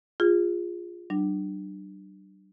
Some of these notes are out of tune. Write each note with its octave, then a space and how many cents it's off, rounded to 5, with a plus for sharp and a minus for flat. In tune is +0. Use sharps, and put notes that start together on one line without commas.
F4 +0 G#4 -20
G3 -45 D4 +30